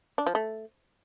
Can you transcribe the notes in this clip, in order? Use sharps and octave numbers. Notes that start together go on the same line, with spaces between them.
D4
F3
A3